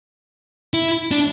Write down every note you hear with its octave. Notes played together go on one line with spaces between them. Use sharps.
E4
D4